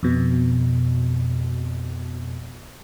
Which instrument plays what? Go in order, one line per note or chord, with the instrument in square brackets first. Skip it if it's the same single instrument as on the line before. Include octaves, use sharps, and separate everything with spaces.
[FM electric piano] F2 B2